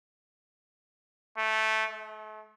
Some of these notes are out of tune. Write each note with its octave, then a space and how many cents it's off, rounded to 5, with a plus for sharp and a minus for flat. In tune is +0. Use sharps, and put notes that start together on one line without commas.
A3 -10
A3 -40